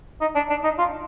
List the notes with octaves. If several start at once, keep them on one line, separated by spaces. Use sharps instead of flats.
D#4
D4
D4
D#4
F4